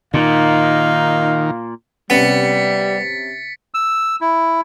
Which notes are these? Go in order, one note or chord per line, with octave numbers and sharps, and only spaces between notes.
A#2 D#3 D#4 F5
C3 G3 B3 C#4 A6 B6 C#7
E6
E4